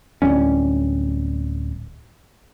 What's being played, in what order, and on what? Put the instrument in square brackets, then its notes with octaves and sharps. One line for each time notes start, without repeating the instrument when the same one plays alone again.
[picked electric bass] D1 E2 G3 C#4